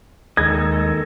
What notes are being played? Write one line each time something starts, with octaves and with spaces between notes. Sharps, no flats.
D#2 D#3 G#3 A4 D#5 G#6